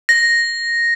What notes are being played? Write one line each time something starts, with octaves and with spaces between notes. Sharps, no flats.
A#6